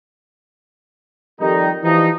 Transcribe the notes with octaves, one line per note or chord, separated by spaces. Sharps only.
F2 D#3 G3 D#4
E3 F3 G3 D#4